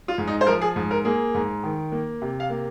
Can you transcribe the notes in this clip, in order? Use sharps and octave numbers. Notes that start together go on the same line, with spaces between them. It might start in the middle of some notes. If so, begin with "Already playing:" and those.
F4
G#2
D#4
C5
F3 A#4
G#4
G#2
A#4
A#3 G#4
G#2
D#3
A#3
C3
F5
A#3